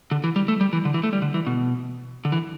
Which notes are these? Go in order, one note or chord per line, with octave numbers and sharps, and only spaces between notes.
D3
E3
G3
A3
G3
E3
D3
E3
A3
G3
D3
E3
B2
D3
E3